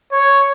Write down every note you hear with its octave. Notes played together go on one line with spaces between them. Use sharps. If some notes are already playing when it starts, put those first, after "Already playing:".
C#5